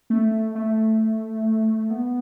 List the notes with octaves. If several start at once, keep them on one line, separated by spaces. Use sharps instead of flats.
A3
A3
B3